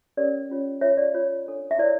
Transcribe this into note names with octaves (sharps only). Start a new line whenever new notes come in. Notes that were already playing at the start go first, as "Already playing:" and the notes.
C#4 G4 A#4 C#5 D5
C#4 F4 C#5
F4 C#5 E5
D5
F4 C#5
D4 A4 C#5
E5
E4 A#4 C#5 D5